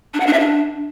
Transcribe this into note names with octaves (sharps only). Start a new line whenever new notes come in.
D4
F#5
D4
E5
D4